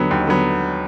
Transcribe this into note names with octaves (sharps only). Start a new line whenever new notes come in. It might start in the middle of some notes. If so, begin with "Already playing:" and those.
Already playing: D#2 D3 F#3 B3
D#2
D3 F#3 B3